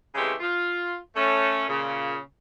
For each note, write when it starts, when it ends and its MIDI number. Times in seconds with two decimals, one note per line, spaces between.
0.15 0.33 49
0.15 0.33 52
0.15 0.33 56
0.15 0.33 57
0.15 0.33 60
0.15 0.33 67
0.40 0.95 65
1.16 1.66 57
1.16 1.66 61
1.68 2.17 46
1.68 2.17 49